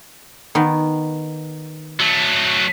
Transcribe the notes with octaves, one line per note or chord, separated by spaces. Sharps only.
D#3 B3
F#3 A3